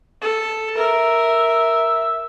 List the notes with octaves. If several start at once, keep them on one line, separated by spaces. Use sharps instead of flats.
A4
A#4 E5